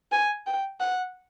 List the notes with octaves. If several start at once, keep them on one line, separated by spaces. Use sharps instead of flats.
G#5
G5
F#5